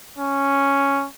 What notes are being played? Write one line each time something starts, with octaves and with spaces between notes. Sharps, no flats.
C#4